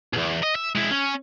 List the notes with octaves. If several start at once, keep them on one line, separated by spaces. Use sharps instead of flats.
B1 E2
D#5
E5
G#3 E4
C#4